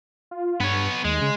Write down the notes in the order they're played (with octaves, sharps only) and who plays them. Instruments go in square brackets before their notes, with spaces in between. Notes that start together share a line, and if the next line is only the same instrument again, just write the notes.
[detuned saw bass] F4
[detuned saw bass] G2 [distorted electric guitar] B3 C#5
[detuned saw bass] D#2 [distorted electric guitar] G#3
[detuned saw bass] C#3